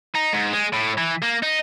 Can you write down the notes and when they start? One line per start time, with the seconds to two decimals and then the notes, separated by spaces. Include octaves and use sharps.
0.15 D#4
0.33 G#2
0.53 G#3
0.73 A2
0.98 E3
1.22 A#3
1.43 D#4